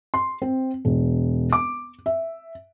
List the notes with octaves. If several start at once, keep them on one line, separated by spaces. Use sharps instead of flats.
C6
C4
E1
D6
E5